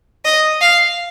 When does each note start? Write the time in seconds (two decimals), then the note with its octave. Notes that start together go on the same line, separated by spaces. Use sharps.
0.25 D#5
0.61 F5